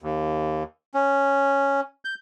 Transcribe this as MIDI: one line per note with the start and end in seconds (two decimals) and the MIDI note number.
0.02 0.63 39
0.94 1.81 61
2.05 2.14 91